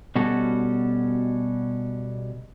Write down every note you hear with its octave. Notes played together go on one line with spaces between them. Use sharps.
B2 G3 C#4 F#4 A4